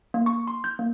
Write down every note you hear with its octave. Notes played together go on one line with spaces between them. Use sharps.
A#3
C#6
C6
G6
A#3